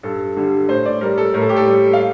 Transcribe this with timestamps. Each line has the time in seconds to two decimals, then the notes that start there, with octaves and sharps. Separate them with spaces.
0.03 G2 A4
0.36 D3 G3
0.68 A2 C5
0.85 D5
1.01 G3 A#4
1.18 A4
1.34 A2 A#4
1.41 A4
1.49 G4
1.56 A4
1.67 G3
1.93 F5